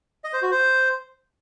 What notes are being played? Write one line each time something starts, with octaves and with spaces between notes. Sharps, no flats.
D#5
C5
F#4
C5